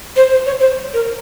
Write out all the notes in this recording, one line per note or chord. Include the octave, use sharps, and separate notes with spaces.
C5
C5
C#5
C5
A#4